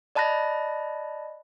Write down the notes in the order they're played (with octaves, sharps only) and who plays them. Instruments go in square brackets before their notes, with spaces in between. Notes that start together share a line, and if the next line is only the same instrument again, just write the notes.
[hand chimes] D5 D#5 A5 B5 F#6 A#6